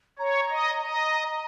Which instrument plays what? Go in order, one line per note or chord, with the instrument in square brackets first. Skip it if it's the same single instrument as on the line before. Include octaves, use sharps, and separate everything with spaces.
[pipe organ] C#5 [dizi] A#5
[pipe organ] D#5
D#5